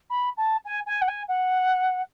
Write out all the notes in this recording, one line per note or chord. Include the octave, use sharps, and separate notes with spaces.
B5
A5
G#5
G#5
F#5
G#5
F#5